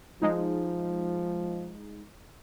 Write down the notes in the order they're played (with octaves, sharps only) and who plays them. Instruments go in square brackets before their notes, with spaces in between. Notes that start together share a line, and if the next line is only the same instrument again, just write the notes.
[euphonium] F3 [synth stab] G#3 D#4